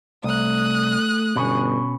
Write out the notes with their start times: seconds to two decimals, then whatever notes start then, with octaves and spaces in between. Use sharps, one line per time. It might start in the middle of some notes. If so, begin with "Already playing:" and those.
0.24 C2 A3 D#6 F#6
1.36 G1 B2 C#4